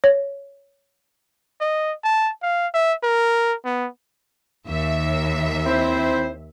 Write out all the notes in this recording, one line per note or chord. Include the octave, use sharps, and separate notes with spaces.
C#5
D#5
A5
F5
E5
A#4
B3
D#2 E5
C4 E4 C5